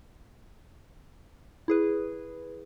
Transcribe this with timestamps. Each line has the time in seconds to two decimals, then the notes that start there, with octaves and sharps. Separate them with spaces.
1.68 E4 G#4 B4